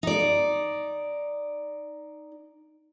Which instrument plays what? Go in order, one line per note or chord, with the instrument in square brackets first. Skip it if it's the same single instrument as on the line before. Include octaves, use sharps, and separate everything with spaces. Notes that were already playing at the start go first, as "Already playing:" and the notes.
[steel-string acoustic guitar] D#4 D5